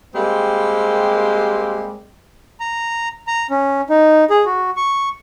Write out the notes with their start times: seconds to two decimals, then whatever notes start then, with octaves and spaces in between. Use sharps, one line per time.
0.14 G3 G#3 A#3 C4 G4
2.60 A#5
3.27 A#5
3.50 C#4
3.90 D#4
4.30 G#4
4.46 F#4
4.77 C#6